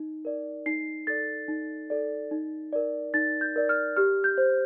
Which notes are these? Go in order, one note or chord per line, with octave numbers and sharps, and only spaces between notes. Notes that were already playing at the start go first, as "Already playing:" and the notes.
Already playing: D#4
A#4 D5
D#4 C7
A4 D5 A6
D#4
A4 D5
D#4
A#4 D5
D#4 A6
G6
A#4 D5
F6
G4 F6
G6
C5